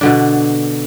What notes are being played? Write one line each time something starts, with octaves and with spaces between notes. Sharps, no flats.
B2 D3 D4